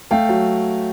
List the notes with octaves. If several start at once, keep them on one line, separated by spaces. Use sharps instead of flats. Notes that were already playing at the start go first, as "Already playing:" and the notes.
A3 F5 G5
F#3